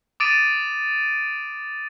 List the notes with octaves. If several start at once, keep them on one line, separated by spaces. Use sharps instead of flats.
D6 D#6 A6 D7 D#7